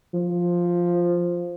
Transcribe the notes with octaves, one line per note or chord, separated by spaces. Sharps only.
F3